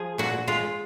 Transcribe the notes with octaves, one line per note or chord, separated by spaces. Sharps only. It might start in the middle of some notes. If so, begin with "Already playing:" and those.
Already playing: F3 G#4
A#2 F#4
G#3 F4